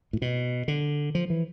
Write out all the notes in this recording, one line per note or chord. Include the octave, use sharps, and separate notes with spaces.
A2
B2
D3
F3
E3